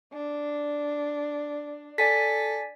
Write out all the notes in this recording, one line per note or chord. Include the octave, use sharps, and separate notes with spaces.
D4
A4 D5 G#5 B6